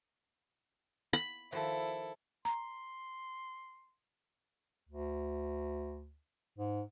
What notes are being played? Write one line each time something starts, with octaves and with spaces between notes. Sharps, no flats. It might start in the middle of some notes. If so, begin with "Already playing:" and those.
B5
D#3 F3 E4 F#4 A4
A#5 C6
D2
G#2